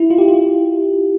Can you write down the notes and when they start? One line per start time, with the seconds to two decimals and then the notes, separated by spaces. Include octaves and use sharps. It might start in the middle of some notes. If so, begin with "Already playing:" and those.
Already playing: E4
0.10 F4
0.18 G4
0.28 F4